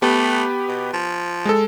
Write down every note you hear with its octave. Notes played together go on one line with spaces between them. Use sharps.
A3 B3 G4 B4
B2
F3
G#3 A4